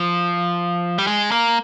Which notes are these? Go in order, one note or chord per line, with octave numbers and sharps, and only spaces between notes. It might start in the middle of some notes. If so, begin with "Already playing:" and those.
Already playing: F3
G3
G#3
A#3